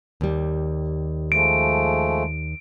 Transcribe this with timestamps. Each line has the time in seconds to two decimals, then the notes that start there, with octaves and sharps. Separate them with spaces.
0.21 D#2 G3
1.32 F3 G#3 A3 D7